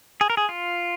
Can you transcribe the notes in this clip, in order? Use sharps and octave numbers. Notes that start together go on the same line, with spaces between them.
G#4
A#4
G#4
F4